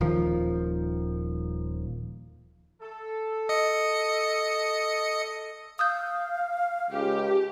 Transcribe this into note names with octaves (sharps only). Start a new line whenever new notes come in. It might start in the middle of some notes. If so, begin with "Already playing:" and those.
D#1 D#3 F3
A4
D#5 C#7
F5 D#6 E6 G6
C#2 G4